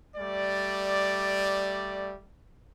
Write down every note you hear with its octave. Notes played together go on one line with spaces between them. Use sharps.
G3 A3 D5